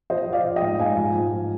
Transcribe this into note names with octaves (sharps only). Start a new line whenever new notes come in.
F3 C5 D#5
F3
D5 F5
F3
D#5 G5
G#2
G#2 F5 G#5
F3
G#2
F3